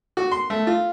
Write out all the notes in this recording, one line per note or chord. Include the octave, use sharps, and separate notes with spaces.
F#4
C6
A3
F4